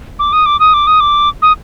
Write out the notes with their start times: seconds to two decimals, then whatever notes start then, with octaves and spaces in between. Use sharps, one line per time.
0.19 D6
0.33 D#6
0.46 D6
0.60 D#6
0.74 D6
0.87 D#6
1.00 D6
1.42 D#6